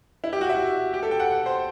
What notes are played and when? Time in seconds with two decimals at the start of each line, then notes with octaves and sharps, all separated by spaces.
0.24 E4
0.33 G4
0.41 F#4
0.50 E5
0.94 G4
1.03 A4
1.11 G5
1.20 F#5
1.46 C5